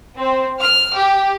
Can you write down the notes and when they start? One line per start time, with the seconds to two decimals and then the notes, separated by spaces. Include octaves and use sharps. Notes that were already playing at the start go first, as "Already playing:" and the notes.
0.18 C4
0.60 F6
0.97 G4